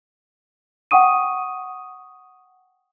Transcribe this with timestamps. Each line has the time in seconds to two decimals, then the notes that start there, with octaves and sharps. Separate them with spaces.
0.91 F#5 G5 C#6 D#6 D#7